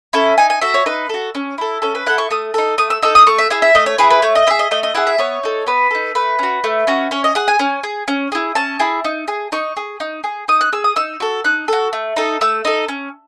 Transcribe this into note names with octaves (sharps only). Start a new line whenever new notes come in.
C#4 E4 A4
D#4 G#5
G#5
F#4 A4 E5
C#5
D#4 B4
F#4 A4
C#4
E4 A4
C#4 A4
B4
E4 A4 F#5
C#6
A3 D#6
D#4 A4
A3 D#6
E6
D#4 A4 E6
D#6
A3 C#6
E5
E4 G#4 E5
E5
A3 D#5
C#5
E4 G#4 B4
B4
A3 C#5
D#5
E4 G#4 E5
D#5
A3 D#5
D#5
E4 G#4 F#5
E5
B3 C#5
D#4 A4
B3 B4
D#4 A4
A3 B4
C#4 F#4
A3
C#4 F#4
C#4 C#5
D#5
G#4 F#5
G#5
C#4
G#4
C#4
E4 G#4
C#4 A5
E4 G#4
D#4
G#4
D#4 C#6
G#4
D#4
G#4
D#4 D#6
F#6
G#4 E6
D#6
D#4 E6
F#4 A4
D#4 F#6
F#4 A4
A3
D#4 A4
A3 E6
D#4 A4
C#4